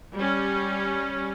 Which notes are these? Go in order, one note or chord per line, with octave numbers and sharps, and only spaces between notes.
G3 C#4